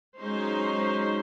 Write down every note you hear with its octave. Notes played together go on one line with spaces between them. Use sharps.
F#3 G#3 C#4 D#4 C5